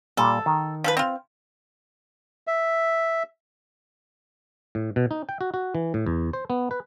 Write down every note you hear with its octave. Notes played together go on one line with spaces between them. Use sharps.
A#2 G3 A4
D#3
F3 A4 B4
C4 F4
E5
A2
B2
D#4
G5
F#4
F#4
E3
A2
E2
C5
B3
B4